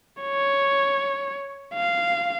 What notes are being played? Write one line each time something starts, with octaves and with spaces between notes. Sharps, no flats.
C#5
F5